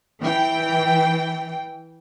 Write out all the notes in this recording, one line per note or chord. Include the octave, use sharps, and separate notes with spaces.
E3 G5